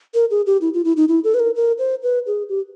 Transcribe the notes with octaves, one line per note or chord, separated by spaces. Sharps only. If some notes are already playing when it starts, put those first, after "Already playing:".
A#4
G#4
G4
E4
F4
E4
D#4
E4
A4
B4
A#4
A#4
C5
B4
G#4
G4